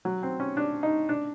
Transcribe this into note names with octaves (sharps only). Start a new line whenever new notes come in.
F#3
C4
C#4
D4
D#4
D4